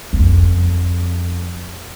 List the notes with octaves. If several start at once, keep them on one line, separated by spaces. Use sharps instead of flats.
E2
F2